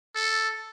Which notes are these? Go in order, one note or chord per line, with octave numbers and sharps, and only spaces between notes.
A4